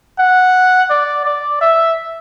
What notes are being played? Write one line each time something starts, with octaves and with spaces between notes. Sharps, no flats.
F#5
D5
D5
E5